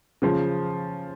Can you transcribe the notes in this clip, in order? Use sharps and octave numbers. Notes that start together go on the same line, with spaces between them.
C#3 F3